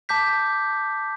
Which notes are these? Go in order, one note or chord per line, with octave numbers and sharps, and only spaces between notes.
A5 D6 G6 B6